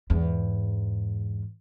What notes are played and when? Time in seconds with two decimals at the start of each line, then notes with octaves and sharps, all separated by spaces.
0.10 E2 G#2